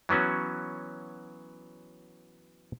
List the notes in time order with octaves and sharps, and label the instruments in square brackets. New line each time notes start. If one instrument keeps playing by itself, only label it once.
[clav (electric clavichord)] E3 F#3 B3 C#4 F#4